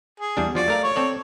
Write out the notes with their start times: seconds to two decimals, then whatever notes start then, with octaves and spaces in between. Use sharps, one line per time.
0.20 G#4
0.37 E2 G3 D4
0.55 F3 F4 F#4 D5
0.68 A3 A#4 F5
0.83 C#5
0.96 C4 A4 D5